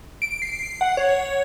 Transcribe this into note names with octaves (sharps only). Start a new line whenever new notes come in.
D7
C7
F#5
C#5